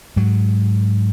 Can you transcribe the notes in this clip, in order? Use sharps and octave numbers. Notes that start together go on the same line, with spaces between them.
G#2 F#3